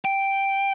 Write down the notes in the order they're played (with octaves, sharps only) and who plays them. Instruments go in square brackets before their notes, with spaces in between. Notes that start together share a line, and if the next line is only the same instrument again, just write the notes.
[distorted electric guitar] G5